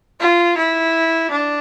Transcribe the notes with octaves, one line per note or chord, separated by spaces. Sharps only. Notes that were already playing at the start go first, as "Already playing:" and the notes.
F4
E4
D4